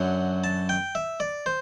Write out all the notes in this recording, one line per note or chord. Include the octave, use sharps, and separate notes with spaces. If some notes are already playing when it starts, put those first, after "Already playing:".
Already playing: F#2 D3 F#3
A5
G5
E5
D5
C5